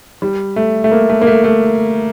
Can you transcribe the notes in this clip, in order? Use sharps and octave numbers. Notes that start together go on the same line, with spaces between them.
G3
A3
A3
A#3
A3
A#3
A3
A3